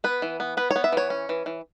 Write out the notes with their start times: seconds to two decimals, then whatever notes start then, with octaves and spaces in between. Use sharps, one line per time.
0.04 B3 B4
0.22 E3
0.40 B3
0.57 B3 B4
0.71 C#5
0.76 B3
0.84 E5
0.92 E3 C#5
1.10 C#4
1.29 E3
1.46 E3